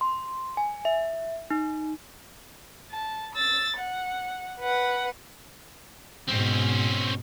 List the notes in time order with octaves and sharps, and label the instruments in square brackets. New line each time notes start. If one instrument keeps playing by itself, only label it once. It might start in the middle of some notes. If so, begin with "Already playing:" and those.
[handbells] C6
G#5
E5
D#4
[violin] A5
E6 A6
F#5
B4 F#5
[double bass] G#2 B2 [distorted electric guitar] C4 C#4